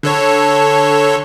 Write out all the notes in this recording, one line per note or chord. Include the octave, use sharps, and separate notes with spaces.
D3 A4 C#5